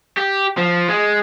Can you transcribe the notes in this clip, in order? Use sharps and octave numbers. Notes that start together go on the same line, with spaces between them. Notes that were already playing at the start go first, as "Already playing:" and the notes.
G4
F3
G#3